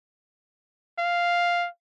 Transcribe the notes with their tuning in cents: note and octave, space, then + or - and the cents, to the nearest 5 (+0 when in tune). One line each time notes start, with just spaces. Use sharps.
F5 +0